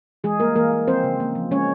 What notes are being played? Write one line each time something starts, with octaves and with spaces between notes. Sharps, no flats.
E3 G#3 G#4
G3 A#3 A#4
E3 A#3 A#4
A#3
F3 C4 C5
C#3
A#3
F3
G#3 C#4 C#5